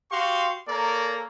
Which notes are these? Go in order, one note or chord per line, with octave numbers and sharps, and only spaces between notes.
F#4 G4 F5 C6 C#6
A#3 A4 A#4 C#5 D5